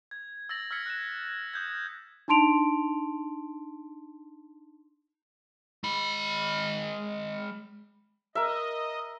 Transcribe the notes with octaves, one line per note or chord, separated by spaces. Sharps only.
G#6
E6 A6 A#6 F#7
E6 F6 G#6 B6 C#7
F#6 E7
D#6 G6 G#6
D4 D#4 A5 C6 D7 F7
G#3 B5
A#4 D#5 E5